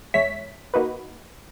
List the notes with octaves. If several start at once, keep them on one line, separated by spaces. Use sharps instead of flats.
E2 G#3 C#5 E5 B6
A#3 D#4 F#4 B4